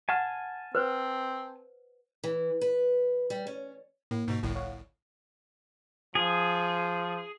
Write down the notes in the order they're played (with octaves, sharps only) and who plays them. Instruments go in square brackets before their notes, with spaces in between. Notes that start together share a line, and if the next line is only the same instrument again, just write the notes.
[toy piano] F#5 [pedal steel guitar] G#5 A5 F6
[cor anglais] C4 [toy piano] B4 C5
[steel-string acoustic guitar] E3
B4
G3
C#4
[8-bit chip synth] A2 [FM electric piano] A#3
[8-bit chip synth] G#2 B2
G1 C2 A2
[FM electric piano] C#5 F5 F#5
[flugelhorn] F3 [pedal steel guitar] G#4